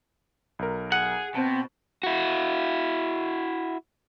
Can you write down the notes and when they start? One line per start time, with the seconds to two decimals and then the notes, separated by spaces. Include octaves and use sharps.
0.59 B1 A#4
0.92 G#4 F#5
1.35 B2 C4 C5 A5
2.03 E4 F#4